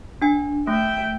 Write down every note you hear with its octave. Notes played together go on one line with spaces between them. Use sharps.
D4 G#5
A3 E5 G5